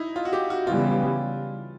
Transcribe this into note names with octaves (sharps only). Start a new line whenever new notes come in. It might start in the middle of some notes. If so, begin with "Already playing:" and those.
Already playing: D#4 E4
F4
F#4
G4
F#4
C#3 E3 G3 B3 F4